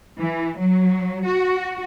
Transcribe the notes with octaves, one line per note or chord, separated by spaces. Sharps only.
E3
F#3
F#4